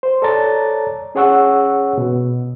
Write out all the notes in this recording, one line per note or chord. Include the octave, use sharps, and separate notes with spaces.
C5
A4 C#5 D5 A5 A#5 A6
C#4 G#4 C#5 F#5 C#6 E6
B2